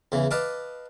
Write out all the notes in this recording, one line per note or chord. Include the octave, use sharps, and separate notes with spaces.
E2 C#3 E3
B4 D#5 F5 A5 D6